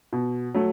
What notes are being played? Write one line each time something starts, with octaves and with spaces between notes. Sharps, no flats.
B2
F#3 A3